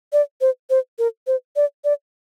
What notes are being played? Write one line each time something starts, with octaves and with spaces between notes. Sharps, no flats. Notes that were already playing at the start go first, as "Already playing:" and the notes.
D5
C5
C5
A#4
C5
D5
D5